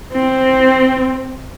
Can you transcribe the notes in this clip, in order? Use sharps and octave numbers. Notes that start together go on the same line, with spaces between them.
C4